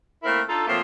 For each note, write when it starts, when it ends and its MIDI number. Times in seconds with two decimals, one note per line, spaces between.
0.23 0.40 57
0.23 0.40 58
0.23 0.40 60
0.23 0.40 64
0.23 0.40 70
0.48 0.67 62
0.48 0.67 63
0.48 0.67 65
0.48 0.67 69
0.67 0.80 46
0.67 0.80 53
0.67 0.80 54
0.67 0.80 57
0.67 0.80 58
0.67 0.80 60